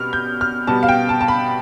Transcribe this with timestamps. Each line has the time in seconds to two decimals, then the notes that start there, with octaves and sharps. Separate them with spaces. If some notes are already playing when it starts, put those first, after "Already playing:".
Already playing: B2 G3 B3 F6
0.13 G6
0.41 F6
0.67 B2 G3 B3 A5
0.83 F5
0.89 G5
1.09 A5
1.21 A5
1.28 B5